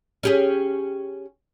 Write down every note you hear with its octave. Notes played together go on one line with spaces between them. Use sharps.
C#4 G4 G#4